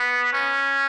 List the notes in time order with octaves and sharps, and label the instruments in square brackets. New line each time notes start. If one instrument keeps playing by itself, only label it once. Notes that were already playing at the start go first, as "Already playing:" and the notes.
Already playing: [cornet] B3
C#4